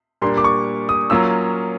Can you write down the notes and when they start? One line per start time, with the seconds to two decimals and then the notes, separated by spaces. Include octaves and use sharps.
0.22 A#2 G3 A#3 D4 C6
0.37 D6
0.44 C#6
0.89 D#6
1.10 F#3 A#3 C#4 F4 E6